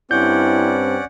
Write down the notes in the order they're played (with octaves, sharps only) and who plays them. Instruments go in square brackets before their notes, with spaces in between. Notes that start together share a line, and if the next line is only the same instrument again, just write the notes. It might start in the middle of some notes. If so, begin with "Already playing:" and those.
[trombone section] G2 C4 [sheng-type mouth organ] C#4 D5 F#5 [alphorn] E4 [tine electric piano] G6